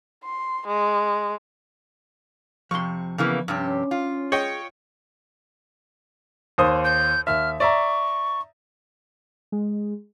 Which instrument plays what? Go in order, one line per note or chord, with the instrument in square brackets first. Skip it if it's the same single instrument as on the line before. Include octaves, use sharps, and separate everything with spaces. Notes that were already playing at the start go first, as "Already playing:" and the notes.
[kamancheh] C6
G#3
[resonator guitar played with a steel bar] F2 C3 [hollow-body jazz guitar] F3 C6 [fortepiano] C#6
[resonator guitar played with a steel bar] C#3 E3 A#3 [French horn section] B3
[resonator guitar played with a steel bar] G2 C3 G4 [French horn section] C#4
[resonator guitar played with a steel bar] F4
[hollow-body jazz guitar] G#4 [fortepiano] C#5 D#5 G5
[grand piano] D#2 C5 D#6
[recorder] G6
[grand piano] D#2 E5 [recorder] F6
[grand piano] D5 E5 A#5 [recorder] C#6
[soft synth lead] G#3